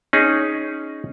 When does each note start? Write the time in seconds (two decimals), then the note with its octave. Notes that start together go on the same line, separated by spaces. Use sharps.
0.13 C#4 D#4 G#4